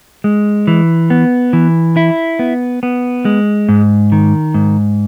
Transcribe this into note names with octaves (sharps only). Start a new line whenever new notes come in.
G#3
E3
B3
E3
E4
B3
B3
G#3
G#2
D#3
G#2